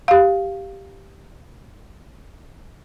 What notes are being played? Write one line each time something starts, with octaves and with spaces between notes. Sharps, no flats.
G4 F5